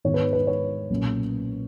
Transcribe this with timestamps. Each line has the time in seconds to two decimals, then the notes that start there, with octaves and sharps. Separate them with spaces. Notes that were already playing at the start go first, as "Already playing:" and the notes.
0.04 G#2 D#3 G#3 B3 C#5
0.14 B4
0.33 B4
0.47 C#5
0.90 B1 A#2 A#3 C#4